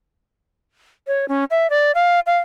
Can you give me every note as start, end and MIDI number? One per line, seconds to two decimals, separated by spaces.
1.07 1.28 73
1.28 1.45 61
1.51 1.70 76
1.70 1.92 74
1.95 2.20 77
2.26 2.37 77